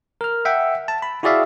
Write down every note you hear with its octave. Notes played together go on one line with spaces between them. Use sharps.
A#4 F6
E5 F#5 G5
A5
B5
E4 F#4 G#4 D5 E5 F5